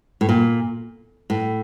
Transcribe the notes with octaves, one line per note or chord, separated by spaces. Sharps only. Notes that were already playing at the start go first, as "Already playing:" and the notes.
A2
A#2
A2